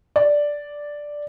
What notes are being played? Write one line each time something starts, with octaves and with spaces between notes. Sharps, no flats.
D5